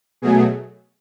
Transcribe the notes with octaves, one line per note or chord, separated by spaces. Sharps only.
B2 F#3 A3 G#4